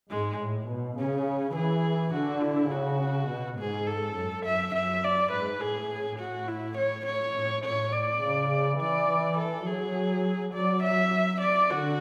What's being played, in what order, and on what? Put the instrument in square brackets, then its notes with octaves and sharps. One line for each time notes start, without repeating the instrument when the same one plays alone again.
[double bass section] G#2 [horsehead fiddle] G#3
[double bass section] A2
B2
[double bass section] C#3 [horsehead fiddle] C#4
[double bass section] E3 [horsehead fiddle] G#4
[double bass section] D3 [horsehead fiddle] F#4
[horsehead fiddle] E4
[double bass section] C#3 [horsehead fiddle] F#4
[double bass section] B2
[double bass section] G#2 [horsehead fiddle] G#4
[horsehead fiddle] A4
[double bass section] F#2
[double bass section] F#2 [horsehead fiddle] E5
[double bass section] F#2 [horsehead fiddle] E5
[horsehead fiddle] D5
[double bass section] G#2 [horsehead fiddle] B4
[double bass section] A2 [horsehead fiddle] G#4
[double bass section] A2 [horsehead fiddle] F#4
[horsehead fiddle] E4
C#5
C#5
[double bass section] A2
[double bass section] A2 [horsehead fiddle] C#5
[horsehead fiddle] D5
[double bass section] C#3
[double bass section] E3 [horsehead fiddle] D5
[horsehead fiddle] A4
[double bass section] F#3 [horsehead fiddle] G#4
[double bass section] F#3 [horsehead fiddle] D5
[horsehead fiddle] E5
D5
[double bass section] D3 [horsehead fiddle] F#4